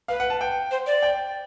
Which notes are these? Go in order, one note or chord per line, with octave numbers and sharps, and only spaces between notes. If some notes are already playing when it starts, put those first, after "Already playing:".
B4 F5
F#5
A5
G5
C5
D5
G5